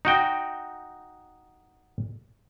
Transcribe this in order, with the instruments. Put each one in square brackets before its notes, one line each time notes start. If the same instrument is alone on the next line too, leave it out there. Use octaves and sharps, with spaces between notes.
[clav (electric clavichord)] D#4 F#4 G5